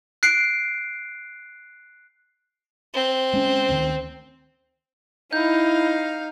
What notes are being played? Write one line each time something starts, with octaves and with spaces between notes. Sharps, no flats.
F#6 C7 D7
C4
G#3 C#4
D2 D#3
D#4 E4 F5 G6